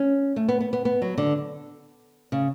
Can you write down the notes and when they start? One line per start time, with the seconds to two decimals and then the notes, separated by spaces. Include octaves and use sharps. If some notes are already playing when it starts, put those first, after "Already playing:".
Already playing: C#4
0.36 A3
0.49 B3
0.61 B3
0.73 B3
0.85 B3
1.02 F#3
1.18 D3
2.32 C#3